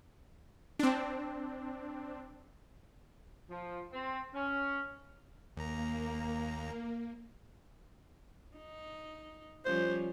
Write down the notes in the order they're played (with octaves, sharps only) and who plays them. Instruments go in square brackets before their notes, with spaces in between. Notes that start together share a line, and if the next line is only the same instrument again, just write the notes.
[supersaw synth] C4 D4
[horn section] F3
C4
C#4
[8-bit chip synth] D#2 A#5 [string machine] A#3
[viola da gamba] D#4
[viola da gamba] F3 G3 C#4 [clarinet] C5